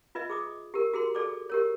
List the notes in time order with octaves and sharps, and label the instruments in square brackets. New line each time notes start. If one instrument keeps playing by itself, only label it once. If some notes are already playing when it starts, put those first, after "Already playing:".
[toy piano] F4 B4 D#5 E5
G#4 D6 D#6
G4 A#4
F#4 G#4 A#4 C6
G#4 A4 D5 D6
G4 A#4 C#5